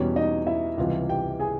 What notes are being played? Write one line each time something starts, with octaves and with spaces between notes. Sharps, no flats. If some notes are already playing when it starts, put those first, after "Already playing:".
Already playing: E2 B2 G3 C#4 C#5
D#4 D#5
E4 E5
C#2 C3 E3 G3 F4 F5
G4 G5
G#4 G#5